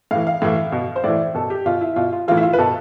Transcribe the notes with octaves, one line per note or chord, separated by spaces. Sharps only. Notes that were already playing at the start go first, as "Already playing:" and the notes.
A2 E3 F5
F5
A2 E3
B2
C5
A2 E3 D5
B2 A4
G4
B2 F4
E4
B2 F4
F4
A2 E3 F4
E4
F4
B4
B2 A4